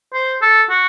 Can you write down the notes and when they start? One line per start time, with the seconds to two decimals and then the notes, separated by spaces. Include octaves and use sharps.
0.14 C5
0.42 A4
0.70 F#4